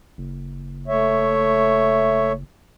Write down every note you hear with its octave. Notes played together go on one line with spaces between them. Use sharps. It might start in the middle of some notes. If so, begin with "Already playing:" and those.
F#1
A3 C#5 E5